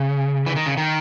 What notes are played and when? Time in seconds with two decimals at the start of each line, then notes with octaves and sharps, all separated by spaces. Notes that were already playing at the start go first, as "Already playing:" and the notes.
Already playing: C#3
0.46 E3
0.56 D#3
0.66 C#3
0.77 D#3